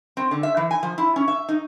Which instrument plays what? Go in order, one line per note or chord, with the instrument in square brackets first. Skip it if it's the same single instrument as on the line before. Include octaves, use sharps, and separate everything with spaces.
[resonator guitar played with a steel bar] C4
D3
E5
E3
G#5
F3
E4
C#4
E5
D#4